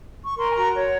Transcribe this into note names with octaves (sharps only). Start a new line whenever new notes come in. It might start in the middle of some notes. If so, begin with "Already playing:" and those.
C#6
A#4 C6
G#5
F#4 A#5
C#5